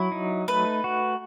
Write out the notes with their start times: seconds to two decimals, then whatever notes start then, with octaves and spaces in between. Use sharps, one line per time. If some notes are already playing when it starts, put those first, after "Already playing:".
Already playing: F#3 E4
0.12 D#4
0.48 A3 B4
0.84 F#4